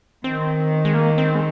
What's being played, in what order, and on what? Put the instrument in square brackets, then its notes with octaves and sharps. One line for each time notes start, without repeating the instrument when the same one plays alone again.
[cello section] D#3 [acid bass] C4
[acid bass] G#3
A#3
C4
G#3